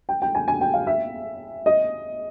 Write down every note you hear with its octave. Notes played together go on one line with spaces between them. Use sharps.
G5
G5
G#5
G#5
G5
F5
E5
D#5